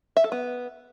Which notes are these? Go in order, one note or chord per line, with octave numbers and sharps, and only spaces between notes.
E5
A4
B3